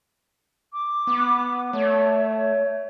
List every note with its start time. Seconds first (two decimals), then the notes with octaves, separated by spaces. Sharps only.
0.73 D6
1.07 B3
1.73 A3 C#5
2.35 C#5